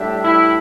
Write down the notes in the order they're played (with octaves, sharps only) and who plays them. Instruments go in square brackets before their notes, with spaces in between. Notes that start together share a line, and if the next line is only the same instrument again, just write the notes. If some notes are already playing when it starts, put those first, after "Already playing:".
Already playing: [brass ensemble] A2 G3 D4 G4 E5
[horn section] E4